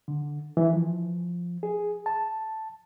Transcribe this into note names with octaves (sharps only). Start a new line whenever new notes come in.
D3
E3
F3
G#4
A5